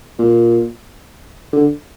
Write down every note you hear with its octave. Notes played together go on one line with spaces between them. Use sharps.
A#2
D3